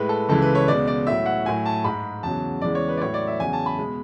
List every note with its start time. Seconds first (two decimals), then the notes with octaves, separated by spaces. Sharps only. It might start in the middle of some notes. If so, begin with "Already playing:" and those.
Already playing: A2 G#3 B4
0.09 A4
0.29 C#2 C#3 E3 G#3 A4
0.42 B4
0.55 C#5
0.68 C#2 B2 G#3 D5
0.88 D5
1.07 A2 F#3 E5
1.26 F#5
1.45 A2 F#3 G#5
1.66 A5
1.84 G#2 G#3 B5
2.23 E2 C#3 F#3 A5
2.62 E2 C#3 E3 G#3 D5
2.75 C#5
2.89 B4
2.97 D5
3.01 A2 F#3 C#5
3.14 D5
3.27 E5
3.40 E2 C#3 F#3 G#5
3.53 A5
3.66 B5
3.78 B2 G#3